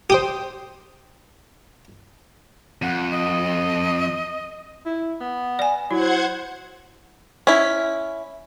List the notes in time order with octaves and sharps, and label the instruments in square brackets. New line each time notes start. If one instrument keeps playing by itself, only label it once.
[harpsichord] G4 [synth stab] C5 G5 D#6
[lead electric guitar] F2 [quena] F#5
[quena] D#5
[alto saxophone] E4
B3
[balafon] D5 G#5
[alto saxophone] F#3 [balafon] E4 [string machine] C5 F#5 G#6
[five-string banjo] C#4 E4